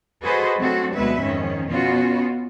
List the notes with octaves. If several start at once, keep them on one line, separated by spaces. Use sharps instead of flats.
F#4 G#4 A4 B4 C5 D#5
F#3 A3 C4 D4 F#4 A4
D2 B2 F#3 G#3 B4 E5
F2 G#2 D#3 F3 C#4
B2 B3 C#4 F4 F#4